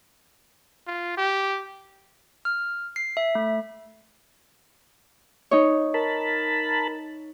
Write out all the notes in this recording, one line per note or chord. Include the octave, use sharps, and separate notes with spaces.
F4
G4
F6
C7
E5
A3
D#4 C#5
A#4 A5 B5